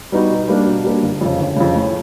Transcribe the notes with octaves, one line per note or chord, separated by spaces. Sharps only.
G3 B3 D#4 F#4
B2
G3 A#3 D4
B2
G3 A#3 D4
G1
F2 C#3
G1
F2 C#3
A2